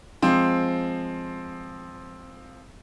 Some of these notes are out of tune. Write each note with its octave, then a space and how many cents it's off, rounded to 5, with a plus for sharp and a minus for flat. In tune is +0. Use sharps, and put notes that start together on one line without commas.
F3 +0 G#3 +0 C4 +5